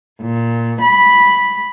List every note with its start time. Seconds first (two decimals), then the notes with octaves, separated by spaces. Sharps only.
0.20 A#2
0.81 B5